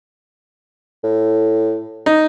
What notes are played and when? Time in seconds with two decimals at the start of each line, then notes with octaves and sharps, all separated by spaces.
1.04 A2
2.06 D#4